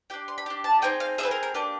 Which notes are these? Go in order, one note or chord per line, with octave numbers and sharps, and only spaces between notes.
D4 G4 G5
C6
B5
D4 G4
A5
C4 D#4 G#4 G5
F5
C4 D#4 G#4 B4 E5
A#4
A#4
A#3 D4 G4 B4